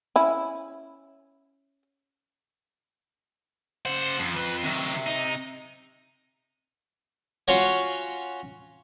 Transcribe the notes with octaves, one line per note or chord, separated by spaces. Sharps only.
C#4 E4
C#3 C5 F#5
F2 F3
B4
C3 D#3 F#3
D#4
C#4 F4 F#4 C#5